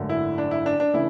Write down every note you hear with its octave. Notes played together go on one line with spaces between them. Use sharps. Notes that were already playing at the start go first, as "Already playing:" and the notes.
Already playing: G#1 F#2 D3 A3
E4
D4
E4
D4
D4
C#3 E3 A3 E4